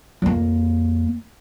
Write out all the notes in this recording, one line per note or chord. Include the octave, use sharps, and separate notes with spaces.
F2 A#3